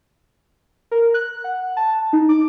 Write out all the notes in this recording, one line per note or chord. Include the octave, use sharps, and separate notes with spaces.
A#4
F#6
F#5
A5
D#4
D6